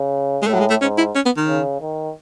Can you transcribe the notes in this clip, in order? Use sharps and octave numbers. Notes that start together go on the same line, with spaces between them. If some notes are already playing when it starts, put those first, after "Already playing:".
Already playing: C#3
G#3
A2 A3
F#3
G#3
A3
G#2 C#4
E4
C#4
B3
D#3
C#3
D#3